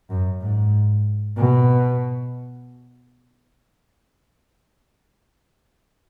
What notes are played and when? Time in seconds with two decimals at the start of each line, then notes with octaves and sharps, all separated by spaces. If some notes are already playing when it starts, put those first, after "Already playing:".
0.10 F#2
0.42 G#2
1.38 B2